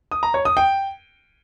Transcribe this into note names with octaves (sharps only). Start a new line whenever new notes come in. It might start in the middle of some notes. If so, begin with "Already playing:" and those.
D#6
A#5
C#5
D#6
G5